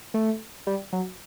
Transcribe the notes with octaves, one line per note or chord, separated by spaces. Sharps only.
A3
G3
F#3